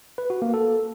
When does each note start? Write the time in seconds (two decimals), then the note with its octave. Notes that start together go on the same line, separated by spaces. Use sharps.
0.18 B4
0.30 F#4
0.42 A#3
0.54 A4